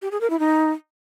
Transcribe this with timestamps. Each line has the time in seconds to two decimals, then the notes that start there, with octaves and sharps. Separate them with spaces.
0.02 G4
0.11 G#4
0.21 A#4
0.30 E4
0.39 D#4